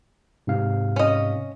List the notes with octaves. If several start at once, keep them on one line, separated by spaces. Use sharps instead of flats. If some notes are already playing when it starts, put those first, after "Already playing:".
G#2 C3 F5
C#4 D#5